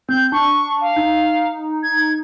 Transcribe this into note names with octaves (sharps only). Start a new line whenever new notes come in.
C4 G6
D4 C#6
F5
D#4
G#6